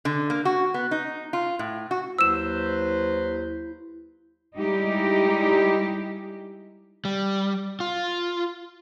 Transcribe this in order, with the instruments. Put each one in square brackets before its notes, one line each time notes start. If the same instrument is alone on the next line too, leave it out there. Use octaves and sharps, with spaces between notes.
[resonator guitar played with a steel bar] D3
A#3
F#4
B3
D#4
F4
A2
F#4
[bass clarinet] D#2 [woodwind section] F#3 B4 C5 [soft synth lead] E4 [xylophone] E6 E7
[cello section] G3 G#3 D#4 E4 G4
[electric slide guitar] G3
F4